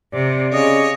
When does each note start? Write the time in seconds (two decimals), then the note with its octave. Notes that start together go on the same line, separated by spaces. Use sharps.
0.13 C3 D5
0.53 C#3 C#5 D#5